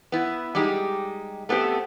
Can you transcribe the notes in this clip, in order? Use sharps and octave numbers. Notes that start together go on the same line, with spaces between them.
B3 E4
G3 G#3 D#4 G4
A3 B3 C4 G4